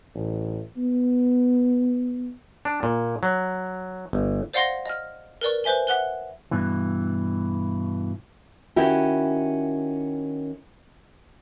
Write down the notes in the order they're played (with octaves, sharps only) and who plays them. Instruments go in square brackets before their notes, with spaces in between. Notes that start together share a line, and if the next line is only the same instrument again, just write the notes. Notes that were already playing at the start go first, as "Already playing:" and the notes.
[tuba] A1
B3
[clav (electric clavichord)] D4
A#2
F#3
G1
[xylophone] C5 D5 F5 F#5 C6 A#6
D#5 F6
A#4 B4 D5 C#6
B4 C5 E5 G#5 G7
E5 F#5 F#6 G7
[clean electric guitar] G2 B2 E3
[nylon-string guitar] D#3 C#4 E4 F#4 G4